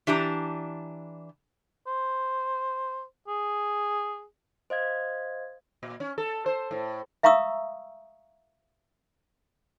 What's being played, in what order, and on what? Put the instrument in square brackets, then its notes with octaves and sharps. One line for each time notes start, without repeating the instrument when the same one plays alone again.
[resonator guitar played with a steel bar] E3 D4 G4 A5 A#5
[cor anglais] C5
G#4
[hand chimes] C5 D#5 F5 G#6
[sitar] A#2
C#4
A4
C5
A2
[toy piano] E5 F5 A#5 C#6 D#6 E6